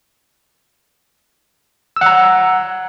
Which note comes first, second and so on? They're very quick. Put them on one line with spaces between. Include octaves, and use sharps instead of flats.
E6 F#5 A#5